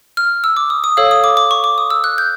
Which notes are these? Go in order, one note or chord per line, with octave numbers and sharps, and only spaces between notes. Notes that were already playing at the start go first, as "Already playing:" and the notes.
F6
E6
D6
D#6
D#6
A4 C#5 F5 E6
D#6
D6
D6
C#6
D6
D#6
E6
F#6
G6